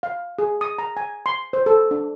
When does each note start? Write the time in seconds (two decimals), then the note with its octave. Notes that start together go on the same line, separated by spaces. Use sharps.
0.03 F5
0.39 G#4
0.61 D#6
0.78 A#5
0.97 G#5
1.26 C6
1.53 C5
1.66 A4
1.91 D4